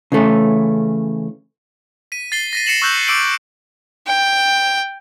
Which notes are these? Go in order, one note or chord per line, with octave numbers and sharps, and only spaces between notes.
C#3 E3 A3 C#4
B6 D#7
A6 C7 G7
A#6 B6 D#7
A#6 C7 C#7 E7 F#7
C#6 E6 F#6 G6 E7 F#7
D6 E6 D7 F#7
G5